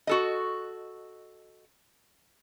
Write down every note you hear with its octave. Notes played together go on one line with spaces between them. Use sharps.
F#4 A4 D#5